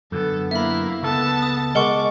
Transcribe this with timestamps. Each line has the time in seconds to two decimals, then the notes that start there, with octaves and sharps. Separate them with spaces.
0.12 F#2 D3 B3 A4
0.51 A#3 E4 E5 B5
1.03 C#2 B3 A4 A5
1.42 D#6
1.75 G#3 A#4 F#5 C#6 D6